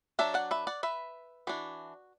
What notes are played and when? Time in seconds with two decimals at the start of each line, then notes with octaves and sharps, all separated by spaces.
0.19 F#3 D4 E5 A5
0.34 D5 F#5
0.51 B4 E5
0.67 D5 F#5
0.83 B4 E5
1.47 E3 D4 F#4